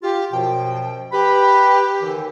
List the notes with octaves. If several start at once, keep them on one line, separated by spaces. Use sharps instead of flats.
F4 G4
F#2 B2 F3 G5
G4 B4 B5
D#2 D3 E3